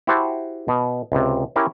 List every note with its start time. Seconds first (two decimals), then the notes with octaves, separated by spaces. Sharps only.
0.07 E4 F#4 G4 C5 F#5 A5
0.68 B2
1.12 C#2 C3
1.56 C#4 E4 G4 A#4 C#5